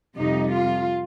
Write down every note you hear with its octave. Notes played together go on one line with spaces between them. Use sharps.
F2 C3 G3 D#4
F4